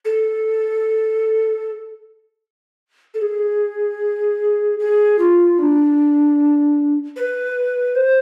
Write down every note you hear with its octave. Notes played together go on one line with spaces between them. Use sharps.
A4
A4
G#4
G#4
F4
D4
B4
C5